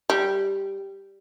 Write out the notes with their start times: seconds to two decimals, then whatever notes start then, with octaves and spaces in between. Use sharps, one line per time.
0.10 G3